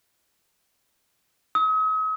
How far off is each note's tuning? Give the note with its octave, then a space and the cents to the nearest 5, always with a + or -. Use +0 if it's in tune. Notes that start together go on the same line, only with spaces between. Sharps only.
D#6 +45